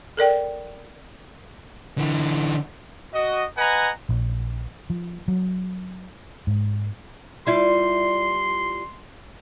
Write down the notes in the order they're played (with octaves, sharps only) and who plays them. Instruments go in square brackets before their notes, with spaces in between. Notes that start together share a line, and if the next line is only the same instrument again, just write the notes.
[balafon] A4 A#4 D5 G5
[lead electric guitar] D3 E3
[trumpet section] F#4 D#5
B4 D#5 F#5 G#5 A#5
[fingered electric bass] A#1
F3
F#3
G#2
[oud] G3 E4 F4 [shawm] C6